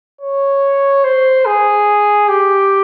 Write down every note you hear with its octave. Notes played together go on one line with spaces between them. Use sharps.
C#5
C5
G#4
G4